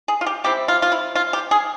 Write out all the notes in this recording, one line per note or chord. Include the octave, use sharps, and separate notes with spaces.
G#4
F4
G4
G3 C4 E4 G4
F4
F4
E4
F4
G4
G#4